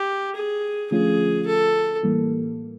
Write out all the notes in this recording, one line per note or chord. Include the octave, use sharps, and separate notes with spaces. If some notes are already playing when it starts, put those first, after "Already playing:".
Already playing: G4
G#4
D3 F3 A3 C#4 F4 G#4
A4
A2 E3 G3 A#3